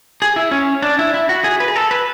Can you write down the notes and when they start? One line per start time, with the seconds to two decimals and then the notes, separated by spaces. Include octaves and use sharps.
0.22 G#4
0.36 E4
0.51 C#4
0.82 D4
0.99 E4
1.14 E4
1.29 F#4
1.44 G#4
1.60 B4
1.68 G#4
1.76 A4
1.91 B4